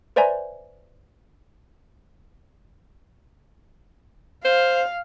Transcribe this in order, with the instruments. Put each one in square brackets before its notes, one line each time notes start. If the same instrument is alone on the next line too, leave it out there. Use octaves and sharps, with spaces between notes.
[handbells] B4 C5 D5 E5 G#5 A#5
[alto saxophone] C5 [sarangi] F5